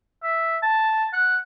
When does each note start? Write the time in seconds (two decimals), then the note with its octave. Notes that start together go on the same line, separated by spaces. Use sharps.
0.23 E5
0.62 A5
1.13 F#5